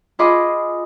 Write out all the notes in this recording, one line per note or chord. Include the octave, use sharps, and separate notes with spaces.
F4 G#4 D#5 B5 C6 D6